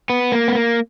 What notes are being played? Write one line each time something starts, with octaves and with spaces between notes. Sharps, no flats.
B3
A#3
B3
A#3